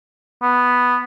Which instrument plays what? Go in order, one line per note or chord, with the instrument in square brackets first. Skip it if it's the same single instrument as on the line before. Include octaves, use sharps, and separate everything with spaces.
[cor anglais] B3